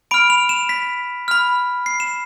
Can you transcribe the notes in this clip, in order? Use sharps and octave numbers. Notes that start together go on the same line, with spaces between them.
B5 F6 D7
F7
E7
B6
B5 F6
C7
E7